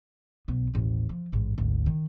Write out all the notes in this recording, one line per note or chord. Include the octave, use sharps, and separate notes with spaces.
B1 B3
A1 D#2
F3
A1 G#2
G#1 D2
D#3